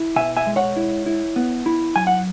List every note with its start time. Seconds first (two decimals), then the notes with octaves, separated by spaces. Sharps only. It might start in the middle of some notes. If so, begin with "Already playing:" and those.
Already playing: E4
0.16 B2 E5 G#5
0.37 E5 G#5
0.47 G#3
0.56 C#5 F#5
0.76 E4
1.06 E4
1.36 B3
1.66 E4
1.96 F#3 G#5
2.07 F#5